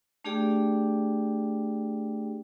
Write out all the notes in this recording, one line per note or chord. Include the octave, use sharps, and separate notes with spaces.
A3 D4 G4 G#4 D5 G5